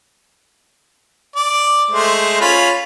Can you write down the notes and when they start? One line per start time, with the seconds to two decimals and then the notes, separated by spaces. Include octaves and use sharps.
1.36 D5
1.91 G#3 A3 C5
2.41 C#4 F4 B5